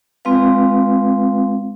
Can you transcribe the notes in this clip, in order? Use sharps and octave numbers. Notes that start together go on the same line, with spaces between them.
G#3 C4 F4 B4 F5